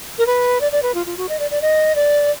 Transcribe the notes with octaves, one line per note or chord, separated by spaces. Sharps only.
A#4
B4
D5
D5
B4
F4
F4
F#4
D#5
D5
D5
D#5
D5